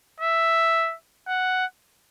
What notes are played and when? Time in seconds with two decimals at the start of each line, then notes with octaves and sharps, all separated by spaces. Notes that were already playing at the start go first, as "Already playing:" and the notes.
0.20 E5
1.28 F#5